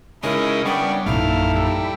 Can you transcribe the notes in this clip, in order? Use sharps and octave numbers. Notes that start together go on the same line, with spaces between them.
C#3 G#3 D#4 E4 A#4
G3 B3 C#4 D4 G5
A#1 F#2 D#4 E4 A4 F5
G3